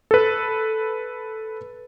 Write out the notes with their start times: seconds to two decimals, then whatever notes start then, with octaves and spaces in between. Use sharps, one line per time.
0.11 A4 B4